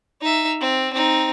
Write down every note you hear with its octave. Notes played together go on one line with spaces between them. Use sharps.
D#4 E5
C4
C4 D#4